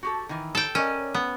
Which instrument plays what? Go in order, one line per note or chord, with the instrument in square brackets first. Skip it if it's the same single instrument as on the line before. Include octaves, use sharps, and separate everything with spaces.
[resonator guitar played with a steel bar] F#4 G4 A4
D#3 E3
[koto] A4 G5
[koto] C#4 [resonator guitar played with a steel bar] A#4 D5 D#5
[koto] B3